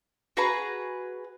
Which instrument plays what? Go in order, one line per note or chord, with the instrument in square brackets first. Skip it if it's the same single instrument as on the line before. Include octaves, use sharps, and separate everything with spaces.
[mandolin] F#4 G#4 B4 A#5